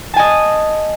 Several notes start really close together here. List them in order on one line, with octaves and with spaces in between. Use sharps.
A5 G#5 D#5